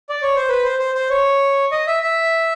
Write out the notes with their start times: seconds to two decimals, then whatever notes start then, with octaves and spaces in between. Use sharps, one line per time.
0.10 D5
0.22 C#5
0.36 C5
0.49 B4
0.64 C5
0.79 C5
0.95 C5
1.10 C#5
1.72 D#5
1.87 E5
2.03 E5